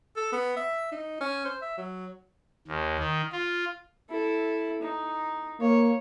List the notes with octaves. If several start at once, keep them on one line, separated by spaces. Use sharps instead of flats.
A4
B3
E5
D#4
C#4
C5
E5
F#3
D#2
D#3
F4
E4 A4
D#4
A#3 C#5